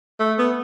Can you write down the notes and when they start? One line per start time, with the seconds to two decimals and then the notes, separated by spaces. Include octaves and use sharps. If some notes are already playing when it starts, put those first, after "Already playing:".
0.20 A3
0.38 B3